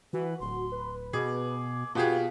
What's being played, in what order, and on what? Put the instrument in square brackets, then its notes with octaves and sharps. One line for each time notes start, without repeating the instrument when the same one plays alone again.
[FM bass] E3 [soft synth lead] F#4 [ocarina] B4
[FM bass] D1 [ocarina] C6
[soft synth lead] B4
[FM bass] B2 [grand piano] G#4 [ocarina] D6
[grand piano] B2 G4 G#4 [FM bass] B3 [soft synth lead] F4 [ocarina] F5